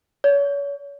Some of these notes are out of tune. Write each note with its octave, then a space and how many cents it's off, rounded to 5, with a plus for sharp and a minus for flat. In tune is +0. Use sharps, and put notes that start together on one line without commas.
C#5 +35